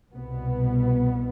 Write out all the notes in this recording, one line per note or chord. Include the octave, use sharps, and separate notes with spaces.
C2 B2 B3